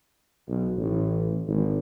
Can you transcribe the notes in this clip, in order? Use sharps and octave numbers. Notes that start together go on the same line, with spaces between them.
B1
A1
G#1